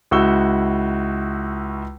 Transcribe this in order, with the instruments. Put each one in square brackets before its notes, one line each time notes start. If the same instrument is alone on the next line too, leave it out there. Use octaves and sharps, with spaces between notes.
[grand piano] C#2 E4 F#4 C#6 E6 G7